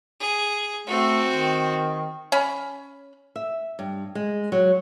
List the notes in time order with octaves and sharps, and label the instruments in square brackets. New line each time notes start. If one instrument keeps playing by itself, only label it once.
[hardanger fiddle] G#4
[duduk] A3 [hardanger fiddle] C4 F#4
[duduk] D#3
[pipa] C#4 B5
[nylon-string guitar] E5
G2
G#3
F#3